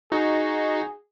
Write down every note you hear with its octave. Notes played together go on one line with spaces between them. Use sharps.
D#4 F#4 G#4